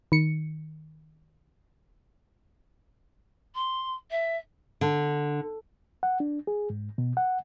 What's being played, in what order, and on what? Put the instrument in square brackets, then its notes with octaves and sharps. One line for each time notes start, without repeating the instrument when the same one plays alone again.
[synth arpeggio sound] D#3 C#7
[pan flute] C6
E5
[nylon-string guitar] D3
[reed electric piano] F#5
D4
G#4
G#2
B2
F#5